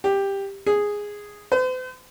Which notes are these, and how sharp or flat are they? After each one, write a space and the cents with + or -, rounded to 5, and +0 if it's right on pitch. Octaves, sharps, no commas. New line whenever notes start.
G4 +10
G#4 -5
C5 -45